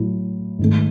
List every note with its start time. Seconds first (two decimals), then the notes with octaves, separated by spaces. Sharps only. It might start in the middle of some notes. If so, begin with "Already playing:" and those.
Already playing: A2 F#3 A3 E4
0.59 G#2 D#3 A3